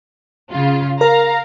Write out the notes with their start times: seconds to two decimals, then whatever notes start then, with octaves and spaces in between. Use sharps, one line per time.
0.52 C#3 F4
1.01 A#4 F5 A#5